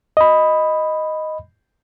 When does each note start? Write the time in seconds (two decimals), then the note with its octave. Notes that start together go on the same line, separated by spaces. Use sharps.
0.17 D#5 B5